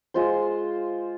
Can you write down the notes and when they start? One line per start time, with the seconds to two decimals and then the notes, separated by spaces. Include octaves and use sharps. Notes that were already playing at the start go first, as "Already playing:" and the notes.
0.14 G#3 F4 C5